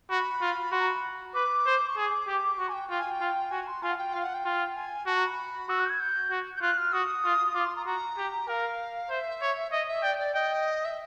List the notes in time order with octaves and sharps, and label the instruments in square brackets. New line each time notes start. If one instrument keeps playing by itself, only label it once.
[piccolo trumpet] F#4 [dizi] B5
[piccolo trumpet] F4
[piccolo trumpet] F#4 [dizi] C6
[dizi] A#5
B5
[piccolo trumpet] B4 [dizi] D6
[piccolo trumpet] C5
[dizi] C#6
[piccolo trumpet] G#4 [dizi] D6
[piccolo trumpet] G4
[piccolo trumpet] F#4 [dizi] C#6
[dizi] G#5
G5
[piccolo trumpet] F4 [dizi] G5
[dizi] G#5
G5
[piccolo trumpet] F4
[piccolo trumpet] F#4 [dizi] G#5
[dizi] C6
[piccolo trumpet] F4 [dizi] G#5
[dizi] F#5
G5
[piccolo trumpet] F4 [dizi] F5
[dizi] F#5
G5
[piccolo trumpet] F4
[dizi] G#5
[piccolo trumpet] F#4 [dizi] A5
[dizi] A#5
B5
[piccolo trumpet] F#4 [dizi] E6
[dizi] F#6
G6
G#6
G6
[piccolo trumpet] F#4
[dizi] G6
[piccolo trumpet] F4 [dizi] F#6
[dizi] F6
[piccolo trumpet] F#4 [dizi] D#6
[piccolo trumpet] F4
[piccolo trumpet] F4 [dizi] D6
[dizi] C6
A#5
[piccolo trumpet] F#4 [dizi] A#5
[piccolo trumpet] G4
[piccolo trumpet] A#4 [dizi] F5
[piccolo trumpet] C5 [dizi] E5
[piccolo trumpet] C#5
[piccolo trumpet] D#5 [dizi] E5
[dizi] E5
[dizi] D5 [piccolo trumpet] G5
[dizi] D5
[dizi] D#5 [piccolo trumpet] G5
[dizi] E5